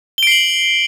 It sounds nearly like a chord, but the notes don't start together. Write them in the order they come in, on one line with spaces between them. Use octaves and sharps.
G7 D7 C7 F#7